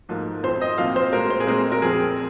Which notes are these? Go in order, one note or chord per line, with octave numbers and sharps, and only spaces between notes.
G#2 F3 A#3
F2 F3 C4 C5
D#5
A#2 F3 C4 F5
C5
A#2 G#3 C4 A#4
C5
G#4
A#2 G#3 C4 A#4
A#4
F2 F3 C4 G#4